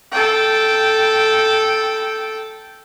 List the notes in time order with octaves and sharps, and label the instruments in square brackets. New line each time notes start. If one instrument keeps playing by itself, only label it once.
[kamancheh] A4 G5